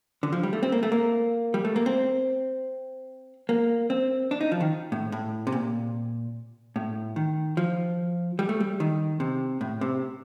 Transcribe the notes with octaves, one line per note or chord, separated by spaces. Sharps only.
D3
F3
G3
A3
C4
A#3
A3
A#3
G3
A3
A#3
C4
A#3
C4
D4
D#4
F3
D#3
A2
A2
C3
A#2
A2
D#3
F3
G3
A3
G3
D#3
C3
A2
C3